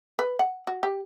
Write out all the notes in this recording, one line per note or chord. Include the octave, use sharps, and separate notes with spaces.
B4
F#5
F#4
G4